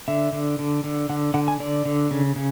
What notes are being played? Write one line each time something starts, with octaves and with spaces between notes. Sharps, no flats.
D3 E5
D3
D3
D3
D3 F#5
D3 F#5
G#5
D3 D5
D3
C#3
C#3